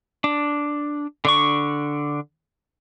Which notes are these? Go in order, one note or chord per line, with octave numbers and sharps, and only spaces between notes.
D4
D3 D4 C#6